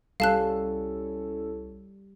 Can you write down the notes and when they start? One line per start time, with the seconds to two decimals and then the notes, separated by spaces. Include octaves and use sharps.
0.20 C2 G3 C#4 E4 A4 F5 A5 F#6